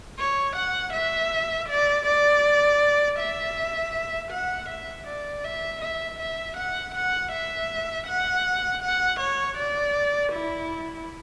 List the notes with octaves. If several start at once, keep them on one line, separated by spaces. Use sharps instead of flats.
C#5
F#5
E5
D5
D5
E5
F#5
E5
D5
E5
E5
E5
F#5
F#5
E5
F#5
F#5
C#5
D5
E4